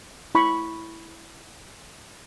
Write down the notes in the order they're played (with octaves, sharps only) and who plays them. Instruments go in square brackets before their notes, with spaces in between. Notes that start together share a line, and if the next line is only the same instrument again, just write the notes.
[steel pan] E4 B5 C#6